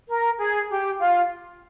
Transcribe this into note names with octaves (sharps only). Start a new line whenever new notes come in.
A#4
G#4
G4
F4